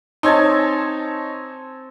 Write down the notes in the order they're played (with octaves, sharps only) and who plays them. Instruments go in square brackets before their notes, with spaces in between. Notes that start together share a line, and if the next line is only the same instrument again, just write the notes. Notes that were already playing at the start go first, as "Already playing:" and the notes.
[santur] C4 G#5 A5 [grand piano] D#4 C#5